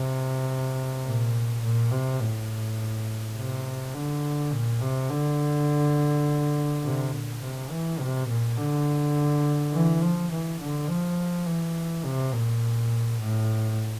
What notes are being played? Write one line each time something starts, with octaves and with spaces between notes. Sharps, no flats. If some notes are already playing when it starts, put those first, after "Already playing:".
Already playing: C3
A#2
A#2
C3
A2
C3
D3
A#2
C3
D3
C3
A#2
C3
E3
C3
A#2
D3
E3
F3
E3
D3
F3
E3
C3
A#2
A2